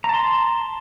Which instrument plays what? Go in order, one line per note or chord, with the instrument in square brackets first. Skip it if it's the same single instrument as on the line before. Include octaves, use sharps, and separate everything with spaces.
[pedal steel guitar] A#5
A5
C6